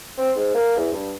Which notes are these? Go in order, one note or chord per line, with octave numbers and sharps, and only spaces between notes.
C4
G#2
A#3
E2
G2